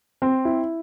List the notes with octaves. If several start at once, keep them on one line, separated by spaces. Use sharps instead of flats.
C4
E4